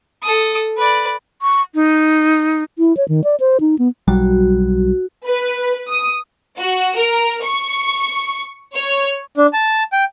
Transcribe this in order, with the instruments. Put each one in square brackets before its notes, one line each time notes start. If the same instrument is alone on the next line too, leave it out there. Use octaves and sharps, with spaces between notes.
[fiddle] A4 D#6
B4 D5
[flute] C#6
D#4
[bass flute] E4
C#5
D#3
D5
C5
D#4
B3
[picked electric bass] B1 F#3 G3 [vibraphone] F#4
[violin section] B4
D#6
F#4
A#4
C#6
C#5
[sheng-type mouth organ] D4
A5
G5